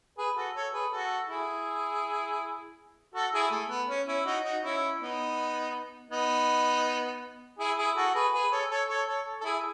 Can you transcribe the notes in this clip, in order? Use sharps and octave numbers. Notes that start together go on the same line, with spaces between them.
G#4 B4
F#4 A4
A4 C#5
G#4 B4
F#4 A4
E4 G#4
F#4 A4
E4 G#4
A3
B3
C#4
C#4 E4
D#4 F#4
D#4 F#4
C#4 E4
B3 D#4
B3 D#4
E4 G#4
E4 G#4
F#4 A4
G#4 B4
G#4 B4
A4 C#5
A4 C#5
A4 C#5
A4 C#5
A4
E4 G#4